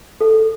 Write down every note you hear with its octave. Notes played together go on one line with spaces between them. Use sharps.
A4